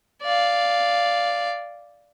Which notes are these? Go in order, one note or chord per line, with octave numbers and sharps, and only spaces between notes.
D5 F5